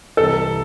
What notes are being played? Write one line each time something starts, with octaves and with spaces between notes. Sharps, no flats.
C2 C3 E3 A4